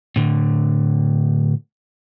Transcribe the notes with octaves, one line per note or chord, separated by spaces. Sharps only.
A2 D3